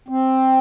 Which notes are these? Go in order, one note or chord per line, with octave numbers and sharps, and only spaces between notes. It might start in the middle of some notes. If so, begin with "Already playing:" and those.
C4